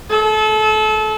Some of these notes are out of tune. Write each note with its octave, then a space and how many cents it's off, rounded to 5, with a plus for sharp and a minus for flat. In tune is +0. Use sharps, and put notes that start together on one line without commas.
A4 -30